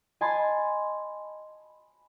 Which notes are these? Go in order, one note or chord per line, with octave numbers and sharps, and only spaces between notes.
D#5 G#5 A5 B5 C6